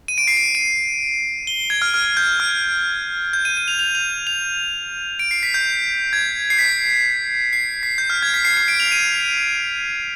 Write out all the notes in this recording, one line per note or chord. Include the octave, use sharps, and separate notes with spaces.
D#7
D7
C7
D7
D#7
G7
G#6
F6
F6
G6
F6
G6
D#7
D#7
F7
F7
F7
F7
D7
C7
B6
G6
G#6
C7
B6
C7
B6
G6
F6
G#6
B6
C7
C7
D7
F7
D#7